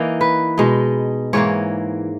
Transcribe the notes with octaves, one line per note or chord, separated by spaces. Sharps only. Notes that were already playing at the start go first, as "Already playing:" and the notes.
Already playing: E3 A#3 D#4
B4
B2 G#3 D#4
G#2 E3 A#3 C#5